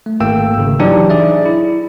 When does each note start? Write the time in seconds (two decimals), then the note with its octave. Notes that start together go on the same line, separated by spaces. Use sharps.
0.06 A3
0.20 G#1 A3 A#3 G5 E6
0.58 G#1 C#3
0.79 E3 F#3 D4 D#4 G4 D5
1.10 G#4 D5 E5
1.45 E4